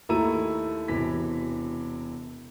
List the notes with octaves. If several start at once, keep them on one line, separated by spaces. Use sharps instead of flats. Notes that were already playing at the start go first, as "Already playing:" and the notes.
D#2 A3 E4 A#5 E6 D#7
E1 C3 E3 B6